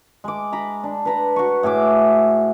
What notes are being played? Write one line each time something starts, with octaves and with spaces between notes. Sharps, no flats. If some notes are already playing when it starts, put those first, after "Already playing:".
G#3 D6
A#5 B5 D6
D4
B4 A#5 B5
F#4 C#6
A2 G#4 E5 D6